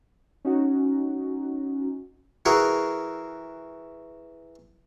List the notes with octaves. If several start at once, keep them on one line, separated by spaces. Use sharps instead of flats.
C#4 D#4 F#4
E3 F#4 G#4 A#4